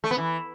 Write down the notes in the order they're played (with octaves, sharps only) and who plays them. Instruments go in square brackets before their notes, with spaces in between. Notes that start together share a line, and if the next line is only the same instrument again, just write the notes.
[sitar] A3
B3
E3